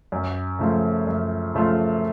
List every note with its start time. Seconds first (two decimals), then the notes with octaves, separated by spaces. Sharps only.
0.12 F#2
0.59 C#3 F3 A3 F4
1.07 F#2
1.54 C#3 F3 A3 F4